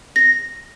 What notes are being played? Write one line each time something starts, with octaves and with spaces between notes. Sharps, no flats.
A#6